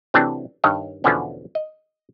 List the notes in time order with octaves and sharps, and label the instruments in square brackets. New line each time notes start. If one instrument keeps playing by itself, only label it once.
[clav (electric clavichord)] C3 E3 F#3 A3 C4 D4
G2 D#3 C#5 D#5
E2 B2 D3 F3 B3 C#4
D#5